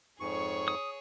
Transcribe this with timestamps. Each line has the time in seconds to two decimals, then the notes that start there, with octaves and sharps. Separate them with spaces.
0.20 F2 G#2 G#4 C#5 C#6
0.68 D#6